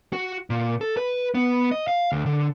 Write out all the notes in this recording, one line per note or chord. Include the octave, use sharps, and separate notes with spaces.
F#4
A#2
A4
B4
B3
D#5
F5
D2
D3